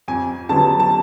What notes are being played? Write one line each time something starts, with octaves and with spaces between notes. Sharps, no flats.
F2 G#5
D3 F#3 B3 A5
A5